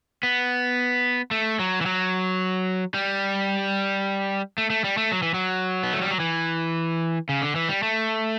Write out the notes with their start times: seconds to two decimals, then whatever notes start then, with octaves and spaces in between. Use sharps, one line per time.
0.23 B3
1.31 A3
1.59 F#3
1.81 E3
1.86 F#3
2.94 G3
4.58 A3
4.70 A3
4.84 G3
4.97 A3
5.12 F#3
5.22 E3
5.34 F#3
5.83 B3
5.93 A3
6.01 G3
6.11 F#3
6.20 E3
7.29 C#3
7.42 D3
7.55 E3
7.69 G3
7.83 A3